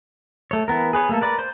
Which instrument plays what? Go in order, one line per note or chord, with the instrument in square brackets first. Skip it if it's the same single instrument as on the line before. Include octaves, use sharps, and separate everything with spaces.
[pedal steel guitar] A3 C#5
E3 B3 A#4
G#4 B4 C#5
A3 A#3 A4
A#4 B4 D5
C5